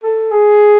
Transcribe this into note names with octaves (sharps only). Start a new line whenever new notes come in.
A4
G#4